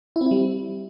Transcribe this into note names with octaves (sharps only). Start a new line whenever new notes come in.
E4
C4
E4
G3